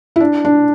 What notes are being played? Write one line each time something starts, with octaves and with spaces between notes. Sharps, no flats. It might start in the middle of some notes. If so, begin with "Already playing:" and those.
E4
D4
D4